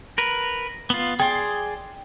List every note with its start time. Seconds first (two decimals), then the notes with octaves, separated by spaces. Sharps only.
0.18 A#4 B4
0.90 B3 F4
1.20 G#4 D5 G5 C6